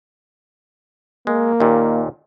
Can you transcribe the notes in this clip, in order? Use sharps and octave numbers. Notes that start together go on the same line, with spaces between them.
G#3 A#3
D#2 A#2